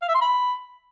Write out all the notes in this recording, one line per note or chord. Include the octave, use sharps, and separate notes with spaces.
F5
E5
C6
B5